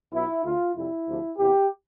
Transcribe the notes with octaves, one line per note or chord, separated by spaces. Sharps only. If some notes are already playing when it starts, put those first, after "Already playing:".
B1 B2 B3 E4
D2 D3 A3 F4
F2 C3 G3 E4
D2 C3 F3
E2 C3 E3 B3 G4